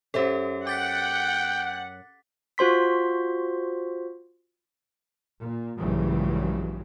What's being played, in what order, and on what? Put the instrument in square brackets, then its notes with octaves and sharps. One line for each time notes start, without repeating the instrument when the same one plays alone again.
[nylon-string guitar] F#2 C5 E5 [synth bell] C#4 G4 A4
[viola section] F#5 [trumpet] G5 [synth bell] D6 A6 B6
[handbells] F4 F#4 C5 C6 B6
[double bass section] A#2
A#1 G2 C#3 E3 F#3 G#3